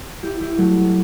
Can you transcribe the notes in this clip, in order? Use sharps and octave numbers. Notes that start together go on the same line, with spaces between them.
E4 G4
E4 G4
F#3 A3